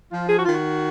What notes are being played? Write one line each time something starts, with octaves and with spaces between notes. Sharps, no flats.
F3 F4
G#4
F#4
D#3 F4
F#4